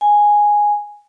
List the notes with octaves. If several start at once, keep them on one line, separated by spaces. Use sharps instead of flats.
G#5